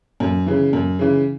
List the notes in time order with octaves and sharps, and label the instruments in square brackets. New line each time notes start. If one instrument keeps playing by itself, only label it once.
[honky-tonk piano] F#2
C#3 E3
F#2
C#3 E3